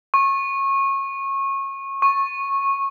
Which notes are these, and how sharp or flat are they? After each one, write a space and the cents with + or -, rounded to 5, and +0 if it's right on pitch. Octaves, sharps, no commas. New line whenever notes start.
C#6 -25
C#6 -15